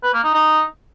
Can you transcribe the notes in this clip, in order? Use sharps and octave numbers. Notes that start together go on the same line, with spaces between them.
B4
A#3
D#4
D#4